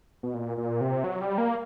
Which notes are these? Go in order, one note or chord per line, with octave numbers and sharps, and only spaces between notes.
B2
A#2
A#2
C3
F#3
G3
A#3